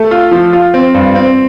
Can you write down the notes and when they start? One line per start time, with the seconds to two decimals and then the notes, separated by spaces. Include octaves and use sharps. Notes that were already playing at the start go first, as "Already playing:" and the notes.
Already playing: A3 A4
0.11 F4
0.31 F3
0.53 F4
0.74 C4
0.94 G2
1.15 C4